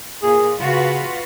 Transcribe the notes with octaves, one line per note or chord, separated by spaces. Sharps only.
A#2 G#4
C#3 F4 F#4 B4